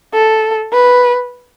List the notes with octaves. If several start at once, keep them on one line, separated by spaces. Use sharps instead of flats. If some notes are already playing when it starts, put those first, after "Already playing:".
A4
B4